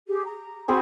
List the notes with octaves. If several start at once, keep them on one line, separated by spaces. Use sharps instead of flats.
G4 G#4
A#5
C4 F#4 G#4 C5 G#5 B5